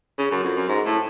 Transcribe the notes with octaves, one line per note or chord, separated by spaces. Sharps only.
C#3
F#2
F2
F#2
G#2
A2